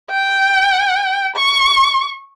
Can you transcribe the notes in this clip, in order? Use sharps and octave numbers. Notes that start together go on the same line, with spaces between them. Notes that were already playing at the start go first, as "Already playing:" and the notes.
G5
C#6